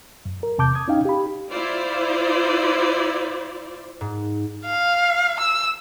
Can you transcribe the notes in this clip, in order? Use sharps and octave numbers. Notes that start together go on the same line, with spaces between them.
F#2
A#4
E2 C3 A5 D6 G6
D#6 G#6
C#4 D#4 F5 G5
G4 B5
E4 F4 C5 D5
G#2
F5
E6